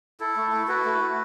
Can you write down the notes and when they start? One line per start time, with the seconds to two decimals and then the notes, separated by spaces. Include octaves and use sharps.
0.20 E4 A4
0.36 A3
0.52 E4
0.68 E4 F#4 B4
0.85 A3
1.01 A3